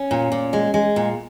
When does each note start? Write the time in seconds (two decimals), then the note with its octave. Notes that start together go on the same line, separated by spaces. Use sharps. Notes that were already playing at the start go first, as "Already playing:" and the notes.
Already playing: C#4
0.11 A#2
0.32 A#2
0.53 G#3
0.74 G#3
0.96 A#2